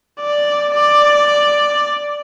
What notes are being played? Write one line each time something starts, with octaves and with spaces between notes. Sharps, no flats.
D5
D5